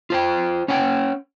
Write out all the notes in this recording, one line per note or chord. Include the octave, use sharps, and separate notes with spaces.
F4 C5 G5
C#4 C#5 F#5 G5